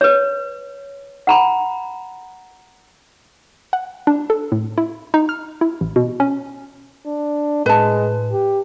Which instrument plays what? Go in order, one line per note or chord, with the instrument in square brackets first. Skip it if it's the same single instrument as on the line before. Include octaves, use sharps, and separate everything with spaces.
[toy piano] B4 C#5
F#5 A#5 B5
[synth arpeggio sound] F#5
D4
A4
A2
E4
D#4
F6
E4
A1
B2
C#4
[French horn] D4
[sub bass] A2 [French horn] G#3 [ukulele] B4 A5
[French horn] G4